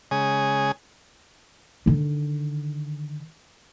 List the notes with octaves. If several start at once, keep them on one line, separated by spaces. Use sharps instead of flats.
C#3 G#3 G#4
D3 D#3